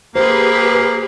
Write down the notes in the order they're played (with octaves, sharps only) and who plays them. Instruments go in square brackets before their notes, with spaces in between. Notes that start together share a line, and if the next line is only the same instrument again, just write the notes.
[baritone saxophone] A#3 [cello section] G4 G#4 B4 [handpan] C5